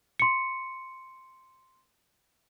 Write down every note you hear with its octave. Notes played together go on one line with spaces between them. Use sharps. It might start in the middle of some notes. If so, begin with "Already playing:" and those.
C6 C#7